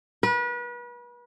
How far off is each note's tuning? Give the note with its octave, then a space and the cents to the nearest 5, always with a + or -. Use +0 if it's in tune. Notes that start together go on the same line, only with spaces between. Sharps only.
B4 -35